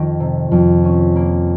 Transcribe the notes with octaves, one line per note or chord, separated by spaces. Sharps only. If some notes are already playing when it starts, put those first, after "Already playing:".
Already playing: F2 D#3
C3
F2
C#4
A#3